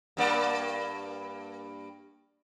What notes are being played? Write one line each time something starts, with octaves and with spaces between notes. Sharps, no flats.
G2 A#3 D5